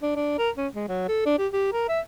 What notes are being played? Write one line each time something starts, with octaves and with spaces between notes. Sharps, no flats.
D4
D4
A#4
C#4
G#3
F#3
A4
D4
G4
G4
A#4
E5